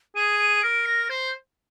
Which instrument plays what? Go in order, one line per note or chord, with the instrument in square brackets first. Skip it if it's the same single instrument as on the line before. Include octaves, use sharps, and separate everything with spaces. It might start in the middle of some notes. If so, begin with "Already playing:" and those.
[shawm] G#4 [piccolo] D#7
[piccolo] D#7
[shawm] A#4 [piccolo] D7
[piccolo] A#6
[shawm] C5 [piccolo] G6